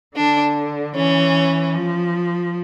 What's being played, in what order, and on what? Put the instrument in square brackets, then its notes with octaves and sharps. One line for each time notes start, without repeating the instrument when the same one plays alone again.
[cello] D3 [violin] D4
[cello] E3 [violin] C#4
[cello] F3